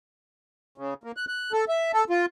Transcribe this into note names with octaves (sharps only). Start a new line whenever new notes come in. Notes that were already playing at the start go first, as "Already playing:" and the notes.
C#3
A#3
F#6
F#6
A4
E5
A4
F4